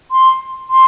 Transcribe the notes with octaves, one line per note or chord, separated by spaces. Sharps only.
C6
C6